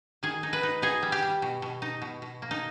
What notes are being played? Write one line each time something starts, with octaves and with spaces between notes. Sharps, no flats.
D#3 G#4
D#4
B4
D#4
D#4 G#4
G3
G4
G3
B2
B2
D#4
B2
B2
A#3
D#4